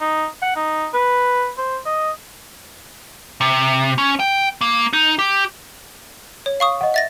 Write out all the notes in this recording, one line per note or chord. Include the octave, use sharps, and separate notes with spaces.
D#4
F#5
D#4
B4
C5
D#5
C3
C#4
G5
A#3
D#4
G4
C#5
F5 C#6 D#6
D#5 F#5
E5 A6 A#6